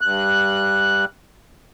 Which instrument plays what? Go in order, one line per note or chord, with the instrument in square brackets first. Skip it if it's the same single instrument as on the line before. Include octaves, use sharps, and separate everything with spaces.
[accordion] G2 F#6